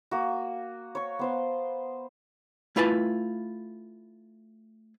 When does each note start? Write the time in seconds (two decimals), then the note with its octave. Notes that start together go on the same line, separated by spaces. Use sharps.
0.11 A#3 F#4
0.95 C#5 C#6
1.19 B3 C5 F5
2.76 A3 E4 F4 B4 G#5 A5